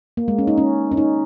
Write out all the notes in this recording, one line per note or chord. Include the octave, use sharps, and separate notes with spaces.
A#3
G#3
C#4
D#4
C#4
C#4
D#4